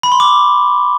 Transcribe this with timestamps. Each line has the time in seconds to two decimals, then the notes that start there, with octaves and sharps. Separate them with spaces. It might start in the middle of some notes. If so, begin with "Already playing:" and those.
0.03 B5
0.12 C6
0.20 D6